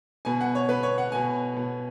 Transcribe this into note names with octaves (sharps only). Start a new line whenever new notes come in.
B2 B3 G#5
F#5
C#5
B2 B3 B4
C#5
F#5
B2 B3 G#5
B2 B3